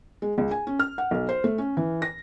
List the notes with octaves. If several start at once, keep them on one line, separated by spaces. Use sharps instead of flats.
G#3
C#2
G#5
C#4
F6
F#5
B1
C5
A3
C#4
E3
A#6